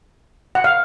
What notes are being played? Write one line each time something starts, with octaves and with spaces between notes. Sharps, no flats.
F#5
F5